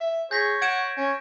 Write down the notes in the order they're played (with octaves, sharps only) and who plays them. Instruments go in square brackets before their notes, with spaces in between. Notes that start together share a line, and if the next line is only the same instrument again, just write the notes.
[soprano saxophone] E5
[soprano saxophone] G#4 [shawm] C#5 [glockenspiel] G6 A#6 B6
[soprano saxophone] F#5 [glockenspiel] G#6 D7 E7
[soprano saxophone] C#4 [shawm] C#5